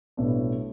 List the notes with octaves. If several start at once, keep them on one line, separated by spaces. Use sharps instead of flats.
B1 A2 G3 B3 D4